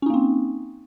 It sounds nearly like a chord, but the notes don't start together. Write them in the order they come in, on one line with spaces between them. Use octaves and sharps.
C#4 D#4 A#3 C4